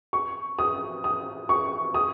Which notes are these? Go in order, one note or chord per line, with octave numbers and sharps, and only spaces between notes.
C#6
D#6
D#6
C#6
D#6